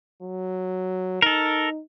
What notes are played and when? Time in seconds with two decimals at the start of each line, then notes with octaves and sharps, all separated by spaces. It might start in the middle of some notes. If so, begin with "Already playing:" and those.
0.23 F#3
1.22 D#4 A4 A#4